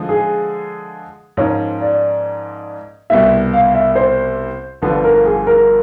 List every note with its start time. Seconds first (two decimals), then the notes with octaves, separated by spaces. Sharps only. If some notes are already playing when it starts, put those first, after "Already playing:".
Already playing: D3 F3 G#3
0.09 G#4
1.37 G#2 F3 A#3 C#4 C#5
1.81 D5
3.10 C2 B2 G3 B3 E4 E5
3.53 F5
3.75 E5
3.95 C5
4.82 G1 G2 D3 F3 B4
5.04 A#4
5.25 G#4
5.47 A#4